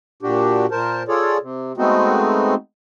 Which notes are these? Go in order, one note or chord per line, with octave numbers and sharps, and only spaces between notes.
A#2 D4 F#4 G4
A#2 A#4 C5 A5
F4 G#4 A4 C#5 D5
C3
G#3 A3 B3 C4 D#4 F#4